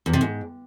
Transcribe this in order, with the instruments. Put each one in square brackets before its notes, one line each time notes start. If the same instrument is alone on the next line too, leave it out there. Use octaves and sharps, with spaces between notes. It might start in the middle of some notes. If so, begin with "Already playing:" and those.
[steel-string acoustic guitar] E2
C3
G#2